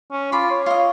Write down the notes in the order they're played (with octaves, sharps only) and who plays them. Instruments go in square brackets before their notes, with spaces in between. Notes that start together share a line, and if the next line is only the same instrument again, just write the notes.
[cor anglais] C#4
[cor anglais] F4 [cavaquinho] B5 D6
[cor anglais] C#5
[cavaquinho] F4 D#5